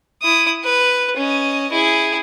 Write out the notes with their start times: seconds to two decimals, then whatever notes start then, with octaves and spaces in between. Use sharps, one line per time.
0.22 E4 D#6
0.64 B4
1.17 C#4 D#5
1.72 E4 G#4